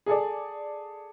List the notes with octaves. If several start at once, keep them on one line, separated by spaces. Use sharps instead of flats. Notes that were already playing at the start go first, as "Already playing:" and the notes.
G#4 A4 D5